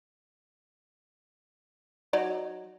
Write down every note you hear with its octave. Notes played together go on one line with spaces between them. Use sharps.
F#3 D#4 D5